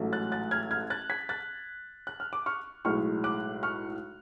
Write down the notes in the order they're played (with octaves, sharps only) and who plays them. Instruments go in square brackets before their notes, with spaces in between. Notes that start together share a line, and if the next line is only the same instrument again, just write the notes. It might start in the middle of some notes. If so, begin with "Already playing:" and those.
Already playing: [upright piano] A1 G#2 F#3 A3
F#6 A6
F#6 A6
F6 G#6
F6 G#6
F#6 A6
G#6 B6
F#6 A6
F#6
F6
D6
C#6 F6
B1 A2 G#3 C#6 F6
D6 F#6
C#6 F6